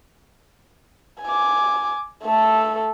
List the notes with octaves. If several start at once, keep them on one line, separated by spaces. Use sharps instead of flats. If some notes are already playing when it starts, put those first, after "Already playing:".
G#5 D6
A3 A4